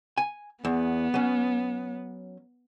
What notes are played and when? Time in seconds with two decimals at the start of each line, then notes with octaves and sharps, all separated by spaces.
0.17 G#5
0.65 E2 B3
1.14 F#3 C#4